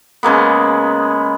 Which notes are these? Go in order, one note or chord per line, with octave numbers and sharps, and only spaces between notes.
C#3 G#3 A#3 B3